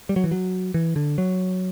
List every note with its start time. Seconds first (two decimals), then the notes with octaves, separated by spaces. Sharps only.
0.09 G3
0.16 F#3
0.24 E3
0.31 F#3
0.74 E3
0.96 D3
1.18 F#3